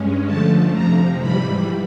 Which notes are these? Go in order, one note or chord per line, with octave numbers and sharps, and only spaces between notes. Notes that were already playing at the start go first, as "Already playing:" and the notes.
Already playing: G2 G#3 C#4
D3 F3 A3 A5
F2 C3 F3 A#5
G#2 E3 G3 B5